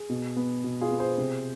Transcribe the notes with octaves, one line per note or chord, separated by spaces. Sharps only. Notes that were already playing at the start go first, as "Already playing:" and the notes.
Already playing: G#4
B2
B3
B2
F4 G#4
B3
G#4 C5
C3